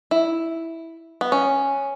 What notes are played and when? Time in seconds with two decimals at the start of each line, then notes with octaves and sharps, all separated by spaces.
0.11 E4
1.21 B3
1.32 C#4